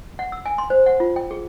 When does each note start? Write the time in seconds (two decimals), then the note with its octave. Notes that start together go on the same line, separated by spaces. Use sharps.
0.19 F#5
0.32 E6
0.46 G#5
0.58 C6
0.70 C5
0.86 F#5
1.00 F4
1.16 G5
1.31 G#4